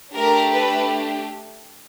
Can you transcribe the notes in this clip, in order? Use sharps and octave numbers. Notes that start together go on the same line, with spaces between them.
A3 D4 G4 A#4
B4